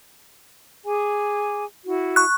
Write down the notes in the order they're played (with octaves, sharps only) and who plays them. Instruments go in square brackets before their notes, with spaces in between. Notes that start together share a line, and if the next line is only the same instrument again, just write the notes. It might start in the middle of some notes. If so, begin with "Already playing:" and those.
[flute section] G#4 G#5 D6
E4 F#4
[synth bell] C#6 F#6